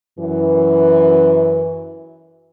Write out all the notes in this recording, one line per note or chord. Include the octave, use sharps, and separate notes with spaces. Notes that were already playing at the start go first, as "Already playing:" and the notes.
F#2 E3